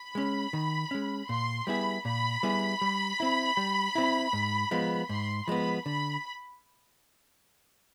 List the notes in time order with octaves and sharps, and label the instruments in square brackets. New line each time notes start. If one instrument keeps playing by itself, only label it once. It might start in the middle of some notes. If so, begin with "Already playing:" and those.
Already playing: [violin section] B5
[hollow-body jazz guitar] G#3 C#4
D#3
G#3 C#4
[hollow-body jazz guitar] A#2 [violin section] C6
[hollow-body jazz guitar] G3 B3 E4 G#4 [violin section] B5
[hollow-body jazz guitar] A#2 [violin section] B5
[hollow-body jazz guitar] G3 B3 E4 G#4
G3
C4 E4
G3
C4 E4
G#2
F3 G#3 B3
[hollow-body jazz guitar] G#2 [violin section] C6
[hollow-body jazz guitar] F3 G#3 B3 [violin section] B5
[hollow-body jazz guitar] D3 [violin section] B5